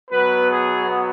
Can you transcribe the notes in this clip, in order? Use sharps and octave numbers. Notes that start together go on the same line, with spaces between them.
B2 F#3 B3 B4
G#4